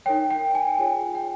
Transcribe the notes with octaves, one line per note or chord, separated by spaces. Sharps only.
D#4 A#4 C#5 G5
G5
G#5
F4 G#4 C#5 G#5
G5